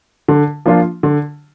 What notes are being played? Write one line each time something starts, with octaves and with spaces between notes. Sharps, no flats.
D3
F3 A#3 D4 F4
D3